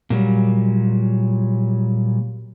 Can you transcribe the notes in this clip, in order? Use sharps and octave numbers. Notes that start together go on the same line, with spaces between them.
A#2 F#3 G3